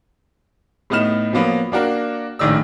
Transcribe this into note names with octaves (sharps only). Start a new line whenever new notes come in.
A2 A3 B3 D#4 F6 E7
F3 F#3 A#3 B3
A#3 D4 F#4 A#4
A#1 A2 D#3 D5 E6